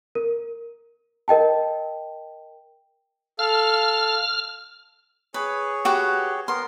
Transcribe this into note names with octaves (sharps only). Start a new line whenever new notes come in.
A#4
A#4 D#5 G5 A5
A4 F5 F6
G#4 B4 C#5
F#4 G4 B4
B3 A#4 C6